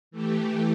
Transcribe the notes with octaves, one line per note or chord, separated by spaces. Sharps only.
E3 A3 G4